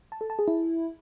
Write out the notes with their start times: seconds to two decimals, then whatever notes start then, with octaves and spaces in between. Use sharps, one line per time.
0.12 A5
0.21 A4
0.30 A5
0.39 G#4
0.48 E4